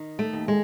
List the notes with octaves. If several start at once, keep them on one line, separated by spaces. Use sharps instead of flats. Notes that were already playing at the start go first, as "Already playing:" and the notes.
Already playing: D#3
A3
D#2
G#3